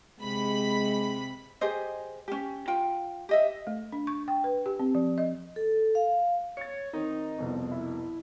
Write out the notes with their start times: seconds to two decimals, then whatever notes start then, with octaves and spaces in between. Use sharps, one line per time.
0.19 C3 G#3 B5
1.61 G4 G#4 C5 D#5
2.28 C#4 G4
2.68 F4 G5
3.29 G4 D#5 E5
3.67 A3
3.92 D4
4.07 C#6
4.28 G5
4.44 B4
4.66 G4
4.79 C4
4.95 F3
5.18 D#5
5.56 A4
5.95 F5
6.57 C#5 A6 C#7
6.93 D#3 C4 D#4
7.38 C2 F2 B2
7.71 E4